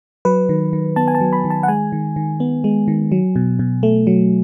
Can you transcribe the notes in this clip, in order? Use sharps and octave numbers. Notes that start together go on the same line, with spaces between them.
F#3 B4
D#3
D#3
B3 A5
G#5
A5
F#3
B5
D#3
A5
F#5
G#3 G#5
D#3
D#3
B3
G#3
D#3
F#3
B2
B2
A3
F#3